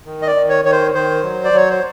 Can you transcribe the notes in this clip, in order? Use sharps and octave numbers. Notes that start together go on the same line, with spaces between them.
D#3
D#5
D5
D#3
C#5
D#3 C#5
C5
D#3 C5
F#3
D5
F#3 C#5
C5